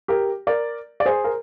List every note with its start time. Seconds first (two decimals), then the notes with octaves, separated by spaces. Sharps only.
0.08 G4 A#4
0.47 A#4 D5
1.00 D5
1.05 G#4 C5
1.24 A#4